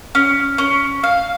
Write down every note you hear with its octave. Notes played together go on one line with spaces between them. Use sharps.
C#4
C#4
F5